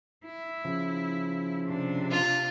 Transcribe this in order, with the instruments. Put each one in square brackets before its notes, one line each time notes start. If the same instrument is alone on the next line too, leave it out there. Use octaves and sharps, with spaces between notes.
[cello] E4
[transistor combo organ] C#3 F3
[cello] C3 D4
[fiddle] F4